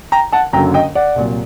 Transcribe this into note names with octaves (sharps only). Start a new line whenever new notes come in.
G5 A#5
F#5 A5
F#1 F#2 D3 F#3 G5 A#5
D#5 G5
D5 F#5
C2 A#2 F#3